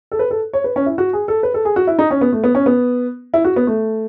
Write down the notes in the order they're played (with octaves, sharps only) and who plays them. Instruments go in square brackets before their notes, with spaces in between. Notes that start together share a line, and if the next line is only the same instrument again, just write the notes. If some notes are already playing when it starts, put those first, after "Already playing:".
[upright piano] A4
B4
A4
C#5
B4
C#4
E4
F#4
G#4
A4
B4
A4
G#4
F#4
E4
D#4
C#4
B3
A3
B3
C#4
B3
E4
F#4
B3
A3